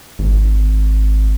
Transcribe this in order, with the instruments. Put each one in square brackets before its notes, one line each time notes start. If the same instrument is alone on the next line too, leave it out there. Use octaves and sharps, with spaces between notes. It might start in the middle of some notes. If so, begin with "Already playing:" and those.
[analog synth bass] G#1